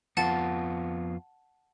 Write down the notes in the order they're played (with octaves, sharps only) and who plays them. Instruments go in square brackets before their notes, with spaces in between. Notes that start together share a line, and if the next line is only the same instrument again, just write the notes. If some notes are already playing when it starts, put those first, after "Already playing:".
[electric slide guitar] F2 B3 F4 [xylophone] F#5 A5 A6